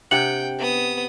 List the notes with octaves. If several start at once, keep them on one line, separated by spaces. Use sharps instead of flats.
C3 D4 F#5 G5 C#7 F#7
B3 D#6